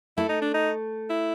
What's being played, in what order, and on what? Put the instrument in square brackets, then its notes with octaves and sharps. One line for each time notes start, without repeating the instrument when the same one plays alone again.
[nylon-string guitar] A3 [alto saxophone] E4
[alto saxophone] D#4
D4
D#4
E4